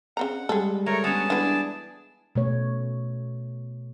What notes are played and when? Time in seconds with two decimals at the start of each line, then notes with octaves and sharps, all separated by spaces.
0.17 C#3 C4 F#5 A#5
0.49 G3 G#3 G#4 A4
0.86 A3 A#4 C#5 A#5
1.04 B3 C#4 G#4 A5
1.30 E3 B3 D4
2.35 B2 A3 C#5